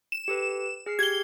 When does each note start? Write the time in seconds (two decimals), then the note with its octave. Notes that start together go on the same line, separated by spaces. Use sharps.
0.12 E7
0.28 G4 A4 B4
0.86 G#4 F6 C7
0.99 G4 G#6 G7